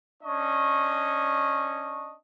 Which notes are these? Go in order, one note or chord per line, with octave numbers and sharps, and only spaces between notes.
C#4 D4 D#5 C#6